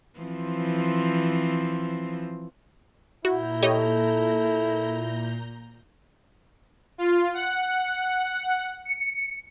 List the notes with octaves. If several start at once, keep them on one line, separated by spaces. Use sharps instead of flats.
E3 F3 C4
A#2 E4 F#4 A#5 G6
G4 A4 C#5 D#5
F4
F#5
C#7